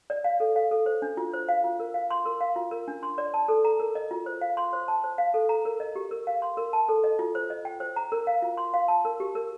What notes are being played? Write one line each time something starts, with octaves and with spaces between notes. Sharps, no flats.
D5
F5
A4
F5
A4
C5
D4
F4
C5
F5
F4
A#4
F5
C6
A#4
F5
F4
A#4
D4
C6
D5
A5
A4
A#5
A#4
D#5
F4
C5
F5
C6
C5
A5
C5
F5
A4
A#5
A#4
D#5
G4
A#4
F5
C6
A#4
A5
A4
D#5
F4
C5
D#5
G5
C5
A#5
A#4
F5
F4
C6
F5
A5
A#4
G4
A#4